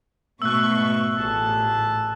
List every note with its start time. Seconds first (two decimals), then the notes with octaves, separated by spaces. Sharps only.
0.42 G#2 B2 A3 C#6 E6 F#6
1.17 A1 A#2 G#4 A5